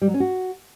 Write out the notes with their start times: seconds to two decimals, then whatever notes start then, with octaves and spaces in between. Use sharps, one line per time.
0.02 G3
0.08 F#3
0.14 C#4
0.20 F#4